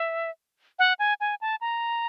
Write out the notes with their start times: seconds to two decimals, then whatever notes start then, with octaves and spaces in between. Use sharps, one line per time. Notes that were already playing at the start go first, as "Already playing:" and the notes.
Already playing: E5
0.79 F#5
0.99 G#5
1.20 G#5
1.41 A5
1.61 A#5